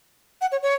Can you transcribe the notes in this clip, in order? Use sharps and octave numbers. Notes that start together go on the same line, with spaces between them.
F#5
C#5
C#5